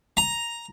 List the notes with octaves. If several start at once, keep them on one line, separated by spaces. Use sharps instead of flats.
A#5